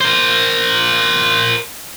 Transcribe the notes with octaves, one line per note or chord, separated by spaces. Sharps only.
A#4 C5